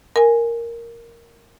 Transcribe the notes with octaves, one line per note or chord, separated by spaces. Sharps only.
A#4 G#5